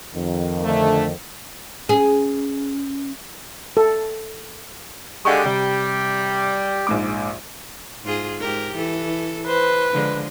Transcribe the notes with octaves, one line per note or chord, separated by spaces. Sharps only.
F2 D#3
D3 A3
C#4 G#4
A4
D3 G#3 G4 F5 F#5 C#6
C3 G3
A#1 G#2 D6
G#2 F4 G#4
G#2 G4 A#4
E3 A4
B4 C5
D3 F3 G#3